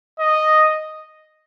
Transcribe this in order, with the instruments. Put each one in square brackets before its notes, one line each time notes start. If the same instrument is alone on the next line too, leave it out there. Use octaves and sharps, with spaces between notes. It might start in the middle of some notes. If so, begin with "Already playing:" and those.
[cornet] D#5